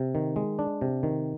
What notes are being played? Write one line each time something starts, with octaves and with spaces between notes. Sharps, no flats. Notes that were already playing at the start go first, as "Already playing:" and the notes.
Already playing: C3
D#3
G#3
D4
C3
D#3